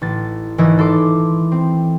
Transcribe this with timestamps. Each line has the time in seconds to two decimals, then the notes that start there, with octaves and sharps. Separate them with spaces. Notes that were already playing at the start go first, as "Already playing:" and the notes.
0.01 A1 A6
0.58 G#1 E3 E4 D#5 G#6
0.79 A4 C6 D6
1.52 C4